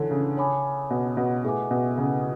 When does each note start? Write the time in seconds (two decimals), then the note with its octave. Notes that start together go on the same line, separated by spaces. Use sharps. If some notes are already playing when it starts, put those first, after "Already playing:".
Already playing: D3 E3 D4 A4 C#5
0.11 C#3
0.37 C#5 G#5 B5 D6
0.90 B2
1.17 B2
1.44 A2 G#4 B4 E5 G#5 D6
1.71 B2
1.97 C#3